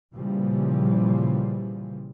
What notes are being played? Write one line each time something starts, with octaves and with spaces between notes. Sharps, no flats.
A#2 C#3 E3 F3 G3